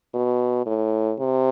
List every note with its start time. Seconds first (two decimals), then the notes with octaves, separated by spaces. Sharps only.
0.14 B2
0.66 A2
1.20 C3